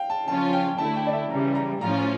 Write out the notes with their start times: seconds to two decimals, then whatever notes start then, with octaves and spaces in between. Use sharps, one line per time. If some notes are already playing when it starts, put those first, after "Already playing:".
Already playing: F5 G5
0.10 A5
0.27 C#3 F3 C#4 F4 A5
0.53 G5
0.78 D2 D3 A3 E4 A5
0.96 G5
1.07 D5
1.13 E5
1.30 C#3 E3 G3 A#5
1.55 A#5
1.81 A2 F3 C#4 F4 A#5